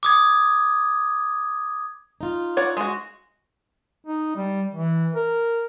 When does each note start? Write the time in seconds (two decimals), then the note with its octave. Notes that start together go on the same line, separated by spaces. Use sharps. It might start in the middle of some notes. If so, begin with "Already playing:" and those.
0.03 D6 D#6 G#6
2.21 D#4 F4
2.57 C#5 D5 F#5
2.77 G#3 F#4
4.07 D#4
4.36 G3
4.72 E3
5.15 A#4